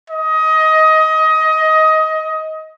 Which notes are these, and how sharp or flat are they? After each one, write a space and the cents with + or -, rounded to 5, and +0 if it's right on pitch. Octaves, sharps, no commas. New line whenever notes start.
D#5 +20